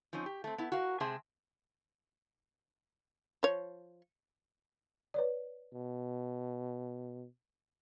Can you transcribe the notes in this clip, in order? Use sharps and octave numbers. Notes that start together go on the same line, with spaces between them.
F3 C4 C#4 D#4
G4
A3 C4
B3 E4
F#4 A#4 F5
C3 G#3 C4 G#4 E5 A5
F3 C#5
B4 C#5 D5
B2